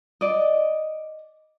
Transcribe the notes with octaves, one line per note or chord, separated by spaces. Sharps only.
D5 D#5